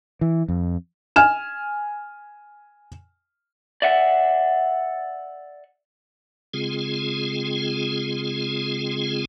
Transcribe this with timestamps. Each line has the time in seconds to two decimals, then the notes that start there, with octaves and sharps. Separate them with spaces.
0.21 E3
0.48 F2
1.16 G#5 F6 E7
3.82 D5 E5 F#5
6.54 C#3 G#3 C4 F4 G#4